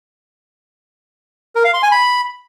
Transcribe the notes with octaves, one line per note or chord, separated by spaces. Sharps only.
A#4
F5
C6
G#5
B5